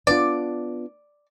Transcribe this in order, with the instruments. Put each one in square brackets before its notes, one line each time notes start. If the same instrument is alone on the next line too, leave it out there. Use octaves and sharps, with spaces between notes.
[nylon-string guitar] B3 D4 F4 [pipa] D5